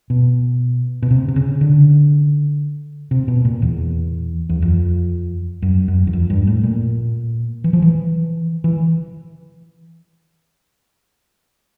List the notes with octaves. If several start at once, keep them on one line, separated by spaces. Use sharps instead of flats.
B2
B2
C3
C3
C#3
D3
C3
B2
A#2
E2
E2
F2
F#2
F#2
E2
F2
G2
A2
A#2
E3
F3
E3
E3